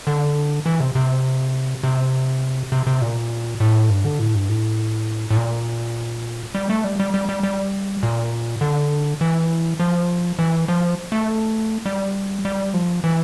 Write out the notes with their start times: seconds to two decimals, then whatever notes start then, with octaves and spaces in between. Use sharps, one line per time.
0.07 D3
0.66 E3
0.80 C3
0.95 C3
1.83 C3
2.72 C3
2.87 C3
3.02 A#2
3.60 A2
3.90 G2
4.04 D3
4.19 A2
4.35 G2
4.49 A2
5.30 A2
5.37 A#2
6.55 G3
6.70 A3
6.84 G3
7.00 G3
7.14 G3
7.29 G3
7.43 G3
8.03 A#2
8.61 D3
9.21 E3
9.80 F3
10.39 E3
10.68 F3
11.12 A3
11.85 G3
12.45 G3
12.74 F3
13.04 E3